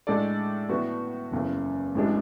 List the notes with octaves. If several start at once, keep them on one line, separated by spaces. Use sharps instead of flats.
A2 G#3 D4 A4 D5
A2 E3 B3 F#4
F#1 E2 C#3 E3 A3
A1 A2 E3 G#3 D4